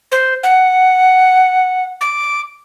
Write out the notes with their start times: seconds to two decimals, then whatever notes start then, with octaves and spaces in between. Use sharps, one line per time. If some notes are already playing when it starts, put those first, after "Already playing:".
0.12 C5
0.43 F#5
2.01 D6